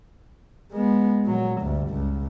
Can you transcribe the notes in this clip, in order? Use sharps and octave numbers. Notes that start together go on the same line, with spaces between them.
G#3 B3
A#2 F#3
D2 G2
C#2